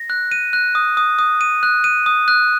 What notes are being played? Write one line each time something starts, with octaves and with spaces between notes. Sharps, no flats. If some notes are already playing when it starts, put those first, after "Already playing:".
Already playing: A#6
F#6
D#7
F#6
D#6
D#6
D#6
D#7
F#6
D#7
D#6
F#6